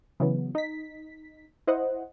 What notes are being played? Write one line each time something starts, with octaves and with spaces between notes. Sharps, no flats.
C#3 E3 F#3 B3
D#4 B6
E4 C5 D#5 F#5